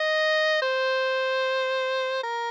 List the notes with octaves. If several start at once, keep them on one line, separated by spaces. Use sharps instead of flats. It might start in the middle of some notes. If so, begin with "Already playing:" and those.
Already playing: D#5
C5
A#4